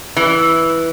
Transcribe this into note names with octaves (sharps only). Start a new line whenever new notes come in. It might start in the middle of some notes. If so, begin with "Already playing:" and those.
E3